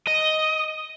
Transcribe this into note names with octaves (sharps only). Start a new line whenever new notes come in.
D#5